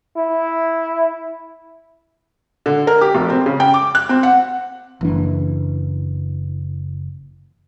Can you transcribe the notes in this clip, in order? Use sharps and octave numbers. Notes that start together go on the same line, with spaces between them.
E4
D3
A#4
G4
F1
C4
C#3
G5
D6
F#6
C4
F#5
F#1 E3 D4